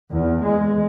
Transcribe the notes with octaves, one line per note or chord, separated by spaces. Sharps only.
E2
G#3